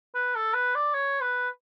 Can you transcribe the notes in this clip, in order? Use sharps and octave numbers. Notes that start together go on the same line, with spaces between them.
B4
A4
B4
D5
C#5
B4